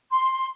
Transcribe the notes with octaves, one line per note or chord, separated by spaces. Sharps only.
C6